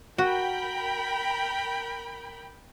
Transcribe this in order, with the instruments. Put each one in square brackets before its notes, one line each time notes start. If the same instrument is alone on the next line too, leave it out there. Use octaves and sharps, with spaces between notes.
[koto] F#4 [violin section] A#4 G5 B5